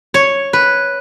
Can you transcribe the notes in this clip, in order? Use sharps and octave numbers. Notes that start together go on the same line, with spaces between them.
C#5
B4